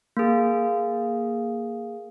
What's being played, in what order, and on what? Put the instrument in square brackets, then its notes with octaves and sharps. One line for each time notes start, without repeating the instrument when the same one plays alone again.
[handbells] A#3 G#4